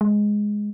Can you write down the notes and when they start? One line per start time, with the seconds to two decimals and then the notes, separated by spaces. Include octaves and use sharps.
0.01 G#3